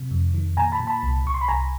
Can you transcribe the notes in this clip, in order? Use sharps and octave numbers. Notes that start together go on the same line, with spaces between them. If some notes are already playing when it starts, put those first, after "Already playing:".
Already playing: C3
F2
D#3
A#2 G#5 A#5
A5 B5
A#2
A5 B5
C2
C2 C#6
C6
B5
C2 G#5 A#5